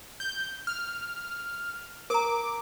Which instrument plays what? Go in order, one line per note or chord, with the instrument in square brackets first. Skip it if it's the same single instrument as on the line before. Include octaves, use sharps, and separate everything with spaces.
[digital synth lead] G6
F6
[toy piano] A#4 A#5 [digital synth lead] D6